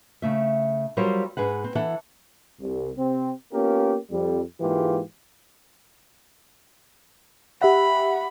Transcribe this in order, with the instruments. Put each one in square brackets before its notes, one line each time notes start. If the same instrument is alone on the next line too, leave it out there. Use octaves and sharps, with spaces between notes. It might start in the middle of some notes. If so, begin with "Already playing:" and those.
[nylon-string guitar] C#3 A3 E5
F#3 G3 F4 A#4 C5 C#5
G#2 G#4 B4 F#5
C4
E3 A4 F#5
[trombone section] C2
C3 C4
A#3 B3 C#4 F4 G4 A#4
F2 G3
G#2 E3 G#3 A#3 F4 G4
[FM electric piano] G4 E5 F#5 [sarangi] B5